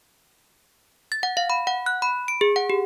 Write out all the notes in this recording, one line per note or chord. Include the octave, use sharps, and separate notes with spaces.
A6
F#5
F5
B5
F#5
F#6
B5
D7
G#4
F#5
G4